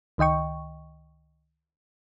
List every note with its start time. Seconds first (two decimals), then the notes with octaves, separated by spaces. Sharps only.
0.18 C#2 D#3 D#5 G5 C#6